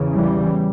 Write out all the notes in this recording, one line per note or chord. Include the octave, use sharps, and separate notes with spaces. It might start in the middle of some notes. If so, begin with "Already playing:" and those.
Already playing: E2 C#3
E3 G3